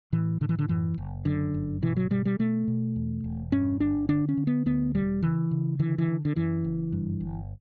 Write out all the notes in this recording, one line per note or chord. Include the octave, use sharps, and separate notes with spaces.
A2 E3
A2 D3
E3
D3
F#2 E3
F#1
F#2 D3
G1
B2 E3
F#3
B2 G3
G3
B2 A3
B2
E2
E1
G2 C#4
G1 D4
D3 D4
C#4
D3
B3
D2 B3
E1 G3
C#3 E3
C#3
D3 E3
E3
D3
D3
F#2 E3
F#1
G2
G1